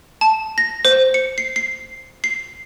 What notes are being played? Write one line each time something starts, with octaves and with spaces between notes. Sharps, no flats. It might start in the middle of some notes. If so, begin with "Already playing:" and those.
A5
A#6
C5
C#7
C7
C7
C7